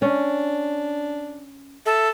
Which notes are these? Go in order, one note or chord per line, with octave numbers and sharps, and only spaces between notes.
C#4 D4
A4 E5